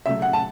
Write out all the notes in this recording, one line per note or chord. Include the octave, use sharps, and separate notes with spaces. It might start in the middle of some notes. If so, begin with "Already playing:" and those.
C#3 F#3 A3 E5
F#5
A5